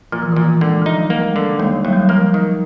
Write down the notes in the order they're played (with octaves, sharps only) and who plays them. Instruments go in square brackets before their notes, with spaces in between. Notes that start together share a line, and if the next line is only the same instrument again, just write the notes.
[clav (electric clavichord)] A#2 [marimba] F3
[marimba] E3
[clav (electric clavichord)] A#2 [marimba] D#3
[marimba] E3
A3
[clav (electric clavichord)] D3 [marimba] G#3
[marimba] E3
[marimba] F3 [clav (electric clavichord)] D#4
[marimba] F#3
G3
[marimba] G#3 [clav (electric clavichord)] A#3
[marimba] G#3
[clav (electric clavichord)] D3
[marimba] G#3
[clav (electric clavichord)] D#2 [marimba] G3
[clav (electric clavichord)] D#2 [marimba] F#3
[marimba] G3
F#3
[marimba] F3 [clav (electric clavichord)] A#3
[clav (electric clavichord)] D#3